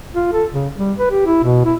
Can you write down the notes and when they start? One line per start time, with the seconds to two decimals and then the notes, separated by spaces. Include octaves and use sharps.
0.15 F4
0.33 A4
0.53 C#3
0.77 G3
0.98 B4
1.11 G4
1.26 E4
1.44 B2
1.65 E4